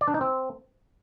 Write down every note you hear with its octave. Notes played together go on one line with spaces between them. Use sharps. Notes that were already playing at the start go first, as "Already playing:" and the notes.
D5
D4
D#4
C4